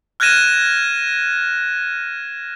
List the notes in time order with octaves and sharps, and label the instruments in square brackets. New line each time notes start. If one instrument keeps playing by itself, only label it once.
[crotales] F6 F#6 G#6 A#6 D#7 E7